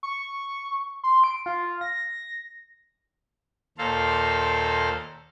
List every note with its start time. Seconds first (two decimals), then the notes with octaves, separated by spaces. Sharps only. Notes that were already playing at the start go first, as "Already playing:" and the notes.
0.03 C#6
1.04 C6
1.24 D7
1.46 F4
1.81 A#6
3.78 D#2 A#2 A#3 A4 C5 F5